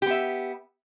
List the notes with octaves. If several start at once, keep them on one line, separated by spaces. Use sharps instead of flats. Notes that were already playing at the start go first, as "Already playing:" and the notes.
B3 G4 E5